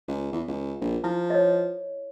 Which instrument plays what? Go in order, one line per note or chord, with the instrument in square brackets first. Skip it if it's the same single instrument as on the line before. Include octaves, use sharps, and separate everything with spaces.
[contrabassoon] C#2
E2
C#2
A#1
[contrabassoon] F3 [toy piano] E4
[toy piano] C#5 D#5